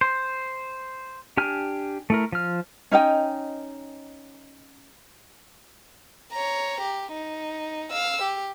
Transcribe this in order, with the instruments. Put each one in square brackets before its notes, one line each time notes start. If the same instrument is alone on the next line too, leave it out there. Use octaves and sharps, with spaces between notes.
[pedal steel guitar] C5
D4 G4 G#5 F6
A3 E4 A#4
F3 F6
[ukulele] C#4 D#4 D#5 G5
[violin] C#5 A#5
G4
D#4
F5 E6
G4